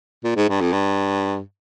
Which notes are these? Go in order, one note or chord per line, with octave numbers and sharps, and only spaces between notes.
A#2
G#2
G2
F2
G2